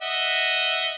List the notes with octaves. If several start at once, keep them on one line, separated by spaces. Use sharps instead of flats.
D#5 E5 F#5